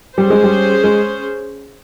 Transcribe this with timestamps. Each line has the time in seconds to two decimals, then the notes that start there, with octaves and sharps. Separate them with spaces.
0.17 G3 C#4 G#4 C5
0.30 G#3
0.43 G3
0.84 G#3